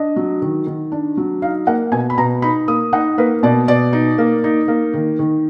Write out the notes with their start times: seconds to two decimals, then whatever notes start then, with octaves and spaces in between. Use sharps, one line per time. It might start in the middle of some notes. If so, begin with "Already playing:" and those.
Already playing: D4 D#5
0.16 F#3
0.42 D#3
0.67 D#3
0.92 D4
1.17 F#3
1.42 D#4 F5
1.67 A#3 F#5
1.92 B2 G#5
2.10 B5
2.18 B2 A#5
2.42 D#4 B5
2.68 A#3 D#6
2.93 D#4 F#5
3.18 A#3 B4
3.43 B2 D5
3.68 B2 D5
3.93 D#4
4.18 A#3
4.44 D#4
4.68 A#3
4.94 D#3
5.19 D#3